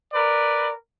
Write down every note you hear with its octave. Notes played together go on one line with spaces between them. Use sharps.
A#4 B4 D5